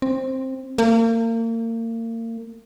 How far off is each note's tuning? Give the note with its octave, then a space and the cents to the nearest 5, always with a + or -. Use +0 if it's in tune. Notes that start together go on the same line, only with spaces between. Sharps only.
C4 +10
A#3 -35